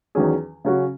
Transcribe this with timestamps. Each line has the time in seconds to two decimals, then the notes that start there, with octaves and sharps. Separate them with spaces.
0.15 E2 D#3 F#3 C#4 G#4
0.65 C#3 F#3 C#4 F#4